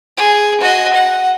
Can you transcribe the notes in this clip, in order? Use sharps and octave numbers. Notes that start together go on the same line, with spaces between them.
G#4
F#4 D#5
F#5